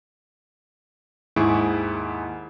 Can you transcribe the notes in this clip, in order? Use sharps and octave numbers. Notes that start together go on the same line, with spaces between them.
D#2 G#2 E4 G#4 C#6 D7